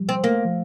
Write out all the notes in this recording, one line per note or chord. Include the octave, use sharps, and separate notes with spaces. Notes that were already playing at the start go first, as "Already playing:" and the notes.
Already playing: F3 G3
C4
A3 A#3
F3